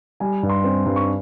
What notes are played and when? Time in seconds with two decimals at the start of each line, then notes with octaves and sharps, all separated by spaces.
0.20 G3 G#5
0.43 G2
0.50 C6
0.64 C4
0.86 G2
0.96 C#6